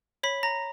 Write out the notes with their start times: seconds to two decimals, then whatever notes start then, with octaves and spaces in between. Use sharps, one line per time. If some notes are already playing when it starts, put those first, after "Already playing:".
0.23 C#5 B5 B6
0.43 A#5 A#6